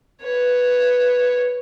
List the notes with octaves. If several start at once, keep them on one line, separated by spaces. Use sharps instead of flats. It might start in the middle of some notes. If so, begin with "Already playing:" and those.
B4 C#5